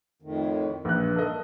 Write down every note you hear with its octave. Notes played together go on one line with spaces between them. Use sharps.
F2 A2 D#3
A#1 G2 F#6
A4 A#4 D#5